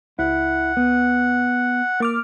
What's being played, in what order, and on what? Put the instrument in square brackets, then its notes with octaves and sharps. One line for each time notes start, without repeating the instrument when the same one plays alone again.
[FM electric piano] C#2 [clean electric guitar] E4 [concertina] F#5
[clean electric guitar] B3
[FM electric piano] A#3 D6 F6